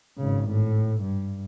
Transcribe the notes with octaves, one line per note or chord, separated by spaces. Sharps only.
G#1 C#3
A2
G2